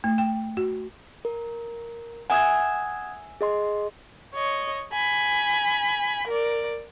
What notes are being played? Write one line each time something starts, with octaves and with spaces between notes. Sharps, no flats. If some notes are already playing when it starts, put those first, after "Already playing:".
A3
G5
F#4
A#4
E5 F#5 G#5 D#6 G#6
G#4 D#5 C6
C#5 D#5
G#5 B5
A#4 D5